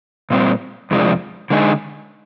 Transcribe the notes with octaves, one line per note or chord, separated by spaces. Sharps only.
A#2 G3 C4
F2 C3 F3 G#3 D4
D3 G#3 D#4 G#4